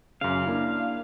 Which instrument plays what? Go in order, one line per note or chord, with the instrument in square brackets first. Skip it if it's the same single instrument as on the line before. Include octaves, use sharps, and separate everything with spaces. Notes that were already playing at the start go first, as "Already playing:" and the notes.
[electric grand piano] F#2 C#3 [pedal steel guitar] F5
[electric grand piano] A#3 D4 E4